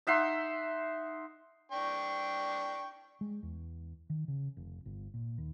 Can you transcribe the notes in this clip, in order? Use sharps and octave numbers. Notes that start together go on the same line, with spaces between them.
D#4 E5 F#5 C6
D4 G5 C#6
G#3
E2
D#3
C#3
F1
G1
A#2
D#2